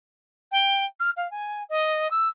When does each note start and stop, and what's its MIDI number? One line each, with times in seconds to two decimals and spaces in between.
0.52 0.84 79
1.00 1.10 89
1.17 1.30 77
1.31 1.64 80
1.70 2.10 75
2.11 2.28 88